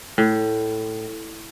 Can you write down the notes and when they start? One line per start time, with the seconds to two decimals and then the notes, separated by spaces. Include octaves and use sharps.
0.18 A2